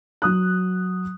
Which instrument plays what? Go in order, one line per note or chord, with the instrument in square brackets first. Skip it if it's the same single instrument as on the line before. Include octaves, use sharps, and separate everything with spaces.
[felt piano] F#3 D#6 F#6